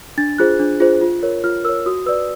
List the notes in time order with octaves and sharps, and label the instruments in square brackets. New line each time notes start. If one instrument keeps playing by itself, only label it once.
[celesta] D4 A6
F4 G#4 C5 F#6
D4
F4 G#4 C5
F4
A#4 C#5
F4 F6
A#4 C#5 E6
F#4 D#6
B4 D5 E6